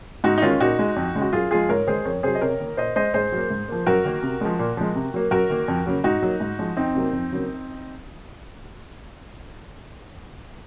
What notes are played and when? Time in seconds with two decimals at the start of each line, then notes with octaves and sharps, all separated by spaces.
0.24 G#2 D#4 F#4
0.38 D#4
0.42 D#3 G#3 C#4 F4
0.61 A#2 D#4 F#4
0.79 G#3
0.96 F2
1.15 C#3 G#3
1.22 F#4
1.33 F#2 F4 G#4
1.51 F3 G#3 F4 G#4
1.69 G#2 A#4 C#5
1.87 D#3 G#3 G#4 C5
2.05 F2 A#4 C#5
2.23 C3 F#3 G#4 C5
2.35 D#5
2.41 C3 A#4 C#5
2.60 D#3 A#3
2.77 A#2 C5 D#5
2.96 G#3 C5 D#5
3.14 G#2 G#4 C5
3.32 F#3 A#3
3.50 G#2
3.68 F3 A#3
3.86 F#2 F#4 A#4
4.05 D#3 A#3
4.23 C3
4.41 F3 G#3
4.59 A#2
4.77 F3 G#3
4.95 C3
5.14 F#3 A#3
5.31 F#2 F#4 A#4
5.50 D#3 A#3
5.68 F2
5.86 C#3 F#3 A#3
6.04 G#2 D#4 F#4
6.22 F#3 A#3
6.40 G#2
6.59 F3 G#3
6.77 F2 C4 D#4
6.95 C3 F#3 A#3
7.13 F2
7.31 C#3 F#3 A#3